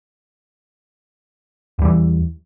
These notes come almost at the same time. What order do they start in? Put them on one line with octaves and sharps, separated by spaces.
E2 G3 E3